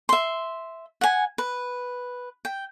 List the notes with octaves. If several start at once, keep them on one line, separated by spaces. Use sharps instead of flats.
E5 C6
F#5 G#5
B4
G5